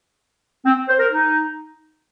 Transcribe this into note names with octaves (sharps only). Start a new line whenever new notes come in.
C4
C5
A#4
D#4